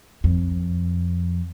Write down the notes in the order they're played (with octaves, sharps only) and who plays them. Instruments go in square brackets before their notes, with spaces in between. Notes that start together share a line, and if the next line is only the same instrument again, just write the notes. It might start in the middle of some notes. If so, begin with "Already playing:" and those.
[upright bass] F2